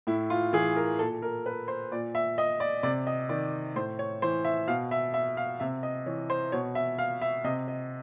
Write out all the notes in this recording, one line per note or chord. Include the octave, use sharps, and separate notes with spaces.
A2 E4
F4
E3 G#4
A#4
A#2 A4
A#4
B4
C5
A#2 D5
E5
D#5
D5
C3 D5
D#5
D#3 D5
A2 C5
C#5
E3 C5
E5
B2 F5
E5
E5
F5
C3 E5
D#5
E3 C#5
C5
B2 C#5
E5
F5
E5
C3 D#5
D#5